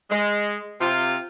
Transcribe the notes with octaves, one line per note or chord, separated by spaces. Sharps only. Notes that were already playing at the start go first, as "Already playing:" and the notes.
G#3
C3 F4